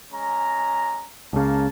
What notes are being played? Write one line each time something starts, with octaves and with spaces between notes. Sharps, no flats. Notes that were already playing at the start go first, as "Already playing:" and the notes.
G#3 C#4 A#5
C#2 C#3 A#3 A5